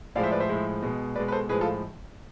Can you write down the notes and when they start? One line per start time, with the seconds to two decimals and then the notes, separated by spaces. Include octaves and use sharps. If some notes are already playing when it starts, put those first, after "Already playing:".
0.15 A2 F3 G#3 D5 F5
0.24 C5 E5
0.32 B4 D5
0.40 C5 E5
0.49 A2 F3 G#3
0.83 B2 G#3
1.15 B2 G#3 B4 D5
1.28 B4
1.32 A4 C5
1.49 A2 F3 G#3 G#4 B4
1.61 F4 A4